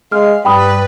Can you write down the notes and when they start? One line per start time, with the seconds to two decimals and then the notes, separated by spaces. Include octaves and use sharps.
0.12 G#3 F5 F6
0.45 G2 G3 B4 G5 B5 D#6